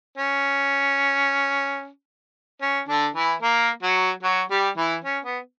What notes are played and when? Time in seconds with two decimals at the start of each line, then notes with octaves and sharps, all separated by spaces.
0.18 C#4
2.61 C#4
2.88 D3 D4
3.15 E3 E4
3.42 A#3 A#4
3.83 F#3 F#4
4.23 F#3 F#4
4.50 G3 G4
4.77 E3 E4
5.04 C#4
5.24 B3